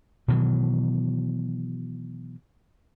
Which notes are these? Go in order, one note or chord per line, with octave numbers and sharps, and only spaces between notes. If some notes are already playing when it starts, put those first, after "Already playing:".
B2 D#3 E3 F#3